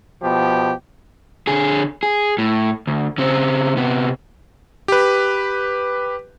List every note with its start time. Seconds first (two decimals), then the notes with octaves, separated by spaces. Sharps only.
0.22 B2 F3 G4
1.47 D3 G#4
2.03 G#4
2.38 A2
2.87 D2
3.18 C#3 C4
3.77 C3 B3
4.88 G4 B4